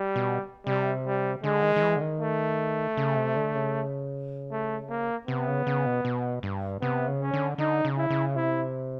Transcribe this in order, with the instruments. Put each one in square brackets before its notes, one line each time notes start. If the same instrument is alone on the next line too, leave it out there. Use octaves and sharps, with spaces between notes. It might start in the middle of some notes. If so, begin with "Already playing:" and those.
Already playing: [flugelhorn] G3
[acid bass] B2
[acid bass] C3 [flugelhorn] G3
[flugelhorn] G3
[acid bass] D3 [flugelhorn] G#3
[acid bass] D#3
D#3
E3
D3
D#3
[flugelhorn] A3
[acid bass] C#3
C3
D3
C#3
[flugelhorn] A3
A#3
[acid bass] C3 [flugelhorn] B3
[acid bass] C#3
C#3
B2
B2
G2
[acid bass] C3 [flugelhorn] B3
[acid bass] C#3
[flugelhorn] C#4
[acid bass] D3
[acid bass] D3 [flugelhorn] D#4
[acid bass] C#3
[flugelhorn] E4
[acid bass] C#3
[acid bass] C3 [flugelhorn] E4